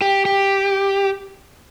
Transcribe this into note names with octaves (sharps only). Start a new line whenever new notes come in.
G4
G4